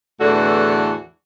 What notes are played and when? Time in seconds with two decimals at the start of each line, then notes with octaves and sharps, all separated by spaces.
0.20 E2 A2 D3 E3 F#4 A4